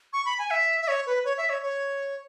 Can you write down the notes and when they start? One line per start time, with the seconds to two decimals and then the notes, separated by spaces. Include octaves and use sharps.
0.13 C#6
0.25 B5
0.39 G#5
0.51 E5
0.82 E5
0.88 C#5
1.07 B4
1.25 C#5
1.38 E5
1.50 C#5
1.63 C#5